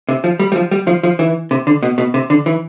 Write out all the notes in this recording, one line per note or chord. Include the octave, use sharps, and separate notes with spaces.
C3
F3
G3
G3
F3
G3
F3
F3
E3
C3
D3
B2
B2
C3
D3
E3